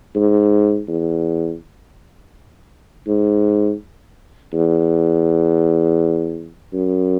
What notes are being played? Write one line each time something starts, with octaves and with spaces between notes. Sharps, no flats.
G#2
E2
G#2
E2
F#2